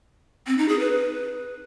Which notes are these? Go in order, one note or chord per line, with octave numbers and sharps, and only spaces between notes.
C4
D#4
G#4
B4